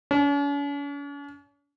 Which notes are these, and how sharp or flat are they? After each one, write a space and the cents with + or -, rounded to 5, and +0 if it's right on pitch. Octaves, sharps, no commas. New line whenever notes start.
C#4 +45